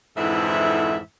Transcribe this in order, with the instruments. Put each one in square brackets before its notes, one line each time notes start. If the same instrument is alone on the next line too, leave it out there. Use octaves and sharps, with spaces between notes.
[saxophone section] F2 G#2 D3 E3 E4 E5